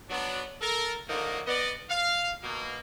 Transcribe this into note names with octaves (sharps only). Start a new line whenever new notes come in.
F#3 B3 D4
A4 A#4
D3 D#3 F3 F#3 A3 A#3
B3 D5 D#5
F5
B2 A#3